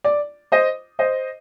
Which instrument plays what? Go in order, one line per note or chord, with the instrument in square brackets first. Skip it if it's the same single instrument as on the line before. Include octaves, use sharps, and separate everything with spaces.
[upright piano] D5
C5 D#5
C5 D#5